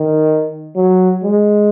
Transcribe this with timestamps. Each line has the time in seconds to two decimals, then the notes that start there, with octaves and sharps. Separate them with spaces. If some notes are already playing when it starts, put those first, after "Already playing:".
Already playing: D#3
0.76 F#3
1.24 G#3